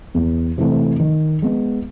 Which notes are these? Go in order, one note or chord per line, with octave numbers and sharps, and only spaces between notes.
E2
C3 E3 A3
D#3
G#3 B3